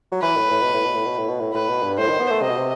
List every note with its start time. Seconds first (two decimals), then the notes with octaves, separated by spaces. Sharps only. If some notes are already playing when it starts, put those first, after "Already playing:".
0.12 F#3
0.22 E3 B4
0.37 A2
0.51 A2
0.62 B2
0.74 A2
0.85 B2
0.95 A2
1.06 B2
1.18 A2
1.29 B2
1.40 A2
1.54 A2 B4
1.69 B2
1.83 G2
1.98 A2 C5
2.09 D#3
2.20 B3
2.31 A3
2.42 C3 D#5
2.49 B2
2.57 C3